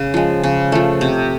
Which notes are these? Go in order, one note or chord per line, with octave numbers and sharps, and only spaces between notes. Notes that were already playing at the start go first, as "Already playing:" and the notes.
Already playing: C#3
F3 G#3
C#3
F3 A3
C3